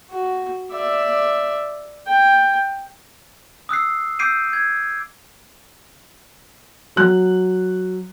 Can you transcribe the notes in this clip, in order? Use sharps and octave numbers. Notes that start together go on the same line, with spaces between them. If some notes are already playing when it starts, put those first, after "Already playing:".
F#4
D5 E5
G5
D#6 E6 F#6 C7
D6 E6 G6 C7 D7 D#7
G#6
F#3 F#6